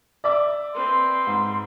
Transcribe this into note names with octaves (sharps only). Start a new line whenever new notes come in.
D5 E5 D6
C4 B4 C6
G#2